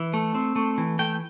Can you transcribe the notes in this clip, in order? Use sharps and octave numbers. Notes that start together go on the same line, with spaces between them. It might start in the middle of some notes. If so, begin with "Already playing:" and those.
Already playing: E3
A3
C4
A3
E3
A3 G5